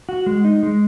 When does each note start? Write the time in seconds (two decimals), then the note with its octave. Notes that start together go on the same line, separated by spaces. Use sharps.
0.09 F#4
0.26 G#3
0.44 D#4
0.63 G#3